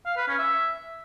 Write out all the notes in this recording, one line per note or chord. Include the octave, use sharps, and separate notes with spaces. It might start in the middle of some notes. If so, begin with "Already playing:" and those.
F5
B4
C#4
E5